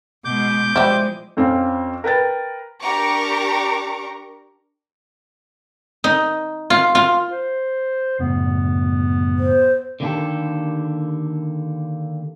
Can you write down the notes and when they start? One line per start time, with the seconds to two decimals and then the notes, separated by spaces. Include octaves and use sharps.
0.25 B2 G#3 D6 G6
0.76 F3 G#3 E4 G4 C5 D5
1.37 F2 C4 C#4 F5
2.04 A#4 B4 G5 A6
2.81 D4 G4 A#4 A#5 C#6 D6
6.04 D#4
6.70 F4
6.95 F4
7.31 C5
8.19 F#2 A2 C#3 B3
9.38 C5
10.00 D3 D#3 A#3 B3 G4 A4